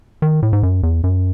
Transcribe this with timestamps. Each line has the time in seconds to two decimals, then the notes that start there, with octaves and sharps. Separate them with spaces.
0.22 D#3
0.42 A2
0.53 G#2
0.63 F#2
0.83 E2
1.04 F#2